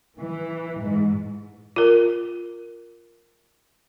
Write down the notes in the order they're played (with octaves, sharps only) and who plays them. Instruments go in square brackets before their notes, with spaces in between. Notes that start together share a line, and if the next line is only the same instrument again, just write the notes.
[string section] E3
G#2
[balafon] F4 A#4